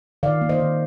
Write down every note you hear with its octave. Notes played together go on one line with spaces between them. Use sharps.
D#3 D5 F5
A#3
C5 D#5
D#3